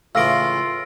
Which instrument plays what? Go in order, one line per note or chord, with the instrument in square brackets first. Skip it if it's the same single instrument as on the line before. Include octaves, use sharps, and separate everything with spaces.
[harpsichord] A2 C#3 E3 [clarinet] F4 [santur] F5 [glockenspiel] E6 A#6 D7